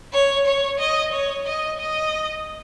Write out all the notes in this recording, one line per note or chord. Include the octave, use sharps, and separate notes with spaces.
C#5
C#5
D#5
C#5
D#5
D#5